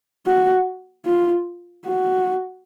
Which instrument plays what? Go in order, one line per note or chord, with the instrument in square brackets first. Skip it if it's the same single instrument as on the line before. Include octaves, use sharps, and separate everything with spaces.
[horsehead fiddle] F#4
F4
F#4